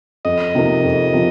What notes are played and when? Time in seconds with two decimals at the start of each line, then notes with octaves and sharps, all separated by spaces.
0.25 F2 D#5
0.55 C3 F3 A#3 D#4
0.84 F2
1.13 C3 F3